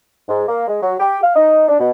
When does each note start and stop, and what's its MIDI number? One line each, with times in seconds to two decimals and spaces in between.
0.28 0.43 44
0.48 0.65 58
0.68 0.82 56
0.82 0.95 54
1.00 1.19 67
1.23 1.35 77
1.36 1.65 63
1.68 1.79 62
1.80 1.91 47